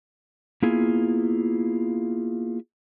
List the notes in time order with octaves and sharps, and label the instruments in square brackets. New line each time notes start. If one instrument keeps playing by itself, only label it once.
[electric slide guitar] A#3 B3 E4 F4 G#4